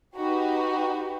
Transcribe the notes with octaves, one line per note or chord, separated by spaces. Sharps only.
D#4 F#4 G4 B4